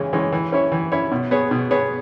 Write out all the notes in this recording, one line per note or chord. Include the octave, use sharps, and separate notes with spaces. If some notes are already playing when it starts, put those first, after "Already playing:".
Already playing: C#3 E3 G#3 C#4
E3 G#3 C#4
E3
C#4 E4 C#5
E3
C#4 E4 C#5
B2
B3 G#4 C#5
B2
B3 G#4 C#5